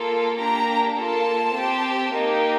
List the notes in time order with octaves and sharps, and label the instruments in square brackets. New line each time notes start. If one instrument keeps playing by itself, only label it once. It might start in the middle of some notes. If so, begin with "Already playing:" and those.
Already playing: [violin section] A#3 F4 A4
A#3 D4 G4 A#5
A#3 F4 A4 A5
C4 G4
A#3 D#4 G4